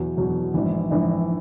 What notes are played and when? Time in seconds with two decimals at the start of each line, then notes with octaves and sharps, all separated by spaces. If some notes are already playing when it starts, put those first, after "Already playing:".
Already playing: E2 B2 F#3
0.17 E2 B2 F#3
0.54 A#1 G#2 E3
0.90 A#1 G#2 E3